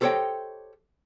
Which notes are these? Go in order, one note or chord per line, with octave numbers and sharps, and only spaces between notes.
G4 A4 C5 C#5 D#5 G5